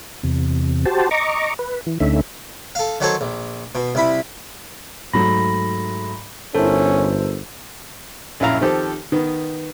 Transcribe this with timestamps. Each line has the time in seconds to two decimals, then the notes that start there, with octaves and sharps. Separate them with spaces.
0.23 E2 C3
0.86 F#4 G4 C5 A5
1.11 D#5 A#5 C#6 D6
1.59 B4
1.86 E3
2.00 D2 D3 A3 C#4 D#4 E5
2.75 A4 F5
3.00 D#3 F#3 F#4 A4 C5 C#5
3.21 A#1
3.75 B2
3.95 C2 E4 B5
5.13 G#2 F#3 A3 B5 A#6
6.55 G1 C#4 E4 A4 A#4 C5 A5
8.40 A#1 F#2 C#4 E4 F5 A#5
8.61 D#3 F3 C4 G4 A4
9.12 D#3 B3